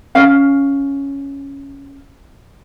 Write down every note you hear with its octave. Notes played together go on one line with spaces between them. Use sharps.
C#4 F5